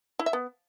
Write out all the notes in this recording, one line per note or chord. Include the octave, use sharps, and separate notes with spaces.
E4
E5
B3